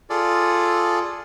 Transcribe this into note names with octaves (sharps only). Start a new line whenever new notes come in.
F4 G#4 A4 D5